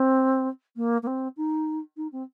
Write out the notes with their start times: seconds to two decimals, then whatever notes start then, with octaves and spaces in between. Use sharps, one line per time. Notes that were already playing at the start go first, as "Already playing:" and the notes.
Already playing: C4
0.76 A#3
1.02 A#3
1.07 C4
1.37 D#4
1.96 D#4
2.12 C4